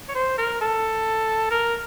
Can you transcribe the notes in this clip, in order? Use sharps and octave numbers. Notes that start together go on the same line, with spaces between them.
C#5
C5
A#4
A4
A#4